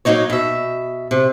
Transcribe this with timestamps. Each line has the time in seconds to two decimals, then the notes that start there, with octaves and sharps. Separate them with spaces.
0.05 F#3 G3 A#3 D#4 C#5
0.30 B2 E5
1.11 C3